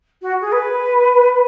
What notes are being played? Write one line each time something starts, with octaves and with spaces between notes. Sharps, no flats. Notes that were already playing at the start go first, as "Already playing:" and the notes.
F#4
G#4
B4